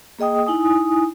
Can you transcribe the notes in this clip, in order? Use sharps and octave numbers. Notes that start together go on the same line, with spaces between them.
A#3 G#4 D#5 G5 D#6
D#4 E4 G#5 D#6